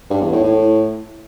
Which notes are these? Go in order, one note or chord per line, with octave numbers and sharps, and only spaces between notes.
G2
E2
A2
A2